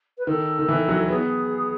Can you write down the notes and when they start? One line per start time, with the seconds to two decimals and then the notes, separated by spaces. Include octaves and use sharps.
0.18 B4
0.27 D#3 A4
0.59 D#3
0.68 E3
0.89 F#3
1.08 B3 G#4